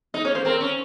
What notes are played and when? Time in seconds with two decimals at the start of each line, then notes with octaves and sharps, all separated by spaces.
0.14 D#4 D#5
0.25 C#4 C#5
0.35 A#3 C5
0.45 C4 A#4
0.61 C#4